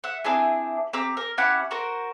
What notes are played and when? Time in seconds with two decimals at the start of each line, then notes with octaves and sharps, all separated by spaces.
0.04 E5 F#5
0.24 C4 D4 E4 G#4
0.93 C4 G4 A#5 E6
1.17 A#4
1.38 C#4 E4 G4 F#5
1.71 F#4 A#4 C5